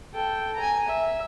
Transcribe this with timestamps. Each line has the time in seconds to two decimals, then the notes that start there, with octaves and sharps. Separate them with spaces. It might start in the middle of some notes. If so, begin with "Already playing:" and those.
0.13 A4 G5
0.56 G#5 A#5
0.88 E5